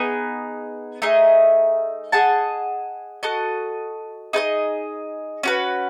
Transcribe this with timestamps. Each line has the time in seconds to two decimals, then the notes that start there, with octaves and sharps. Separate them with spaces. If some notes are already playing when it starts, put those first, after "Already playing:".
Already playing: B3 D#4 G#4
1.02 A3 D#4 G#4 D#5
2.12 G#4 D#5 F#5 A5
3.23 F#4 A4 D#5
4.33 D#4 G#4 B4 D#5
5.43 C#4 F#4 B4